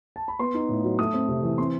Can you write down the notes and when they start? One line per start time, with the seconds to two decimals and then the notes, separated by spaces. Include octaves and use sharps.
0.16 A5
0.28 B5
0.39 B3 C6
0.54 D#4
0.69 A2
0.84 F#3
0.99 A3 D#6
1.14 C4
1.28 C3
1.43 E3
1.58 C4 C6